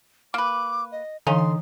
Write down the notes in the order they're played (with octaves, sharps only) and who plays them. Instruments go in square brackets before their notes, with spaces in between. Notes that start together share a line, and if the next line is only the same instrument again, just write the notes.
[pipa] A#3 B4 [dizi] D6
[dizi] D#5
[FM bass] D3 [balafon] E3 F5 G#5 [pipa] D#4 [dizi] C6